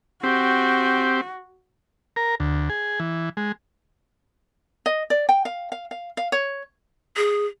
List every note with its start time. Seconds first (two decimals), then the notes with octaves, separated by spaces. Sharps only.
0.23 C4 F#4 G4
2.16 A#4
2.40 D2
2.70 G#4
3.00 E3
3.37 G#3
4.86 D#5
5.10 D5
5.29 G5
5.45 F5
5.72 F5
5.91 F5
6.17 F5
6.32 C#5
7.17 G#4